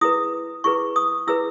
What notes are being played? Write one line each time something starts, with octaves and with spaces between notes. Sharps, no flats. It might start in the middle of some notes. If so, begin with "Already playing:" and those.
E4 G#4 B4 D#6
E4 G#4 B4 C#6
D#6
E4 G#4 B4 E6